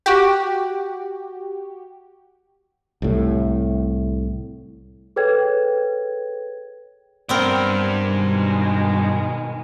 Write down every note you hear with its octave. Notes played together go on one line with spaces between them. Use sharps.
F#4 G4
C2 A2
G#4 A4 B4 C#5 G5 G#6
G2 B3 C4 A#4 D5
B2 D#3 G#3